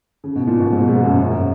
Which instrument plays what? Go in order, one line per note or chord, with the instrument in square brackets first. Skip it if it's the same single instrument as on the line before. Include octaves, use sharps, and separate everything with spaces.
[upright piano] C#3
B2
A#2
B2
G#2
G#2
F#2
F#2